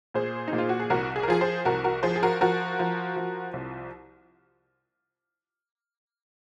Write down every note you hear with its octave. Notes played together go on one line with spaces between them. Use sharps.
A#2 G#4 C5
A#2 D#4
F4
F#4
G#4
C2 F#4 A#4
G#4
A#4
F3 F4 G#4
G#4 C5
C2 F#4 A#4
F#4 A#4
F3 G#4 C5
G#4
F#4 A#4
F3 F#4 A#4
F3
F3
C2